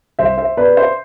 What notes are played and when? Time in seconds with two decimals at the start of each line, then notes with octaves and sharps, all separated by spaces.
0.19 C2 C5 E5
0.38 C5 E5
0.57 B2 B4 D5
0.77 C5 E5